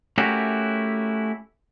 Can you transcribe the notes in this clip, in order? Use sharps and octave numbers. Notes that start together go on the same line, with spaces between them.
A3 C#4 E4 F#4 G4 A#4